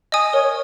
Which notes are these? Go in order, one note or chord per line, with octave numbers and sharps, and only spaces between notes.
D#5 G#5 D#6
A#4 C#5